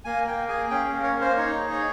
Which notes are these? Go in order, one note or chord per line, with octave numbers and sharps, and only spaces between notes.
A#3 G#5
A#3 G5
G#4 G#5
C#4 G5
A#3
C#5
A#3
C5
D#4 C#5
G#4
C#5